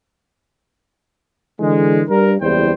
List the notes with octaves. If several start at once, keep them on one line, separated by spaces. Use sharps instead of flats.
D3 E3 G#3
G2 A#4
F#1 E2 G3 C5 G5